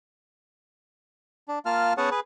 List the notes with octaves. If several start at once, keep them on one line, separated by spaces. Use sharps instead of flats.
D4
A#3 F4 A5 F6
B3 C#4 G#4 C#5 F#5 A5
G#4 B4